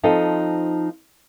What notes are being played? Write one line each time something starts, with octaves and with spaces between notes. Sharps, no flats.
F3 C4 D#4 A4 G5